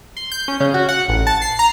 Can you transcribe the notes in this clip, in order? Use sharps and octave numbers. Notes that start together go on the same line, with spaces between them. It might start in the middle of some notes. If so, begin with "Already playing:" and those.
C6
G6
C#4
C#3
F#4
F#5
A1
A5
C7
A#5